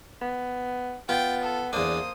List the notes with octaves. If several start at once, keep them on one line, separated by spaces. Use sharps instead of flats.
B3
B3 F4 G5
A4
E2 A#3 D4 C5 D#6